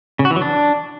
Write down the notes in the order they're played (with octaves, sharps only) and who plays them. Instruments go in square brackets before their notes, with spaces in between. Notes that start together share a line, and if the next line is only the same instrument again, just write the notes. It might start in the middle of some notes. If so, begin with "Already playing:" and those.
[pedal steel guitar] C#3
F#4
E3
F#3
D4